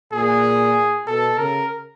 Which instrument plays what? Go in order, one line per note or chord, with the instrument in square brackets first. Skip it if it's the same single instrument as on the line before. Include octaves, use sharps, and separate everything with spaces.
[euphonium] A#2 [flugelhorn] G#4
[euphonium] B2 [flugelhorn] A4
[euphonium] C#3 [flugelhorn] A#4